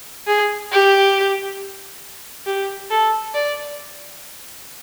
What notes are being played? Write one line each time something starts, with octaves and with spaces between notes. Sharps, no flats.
G#4
G4
G4
A4
D5